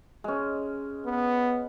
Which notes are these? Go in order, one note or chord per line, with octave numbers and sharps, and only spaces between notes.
G#3 C#4
B3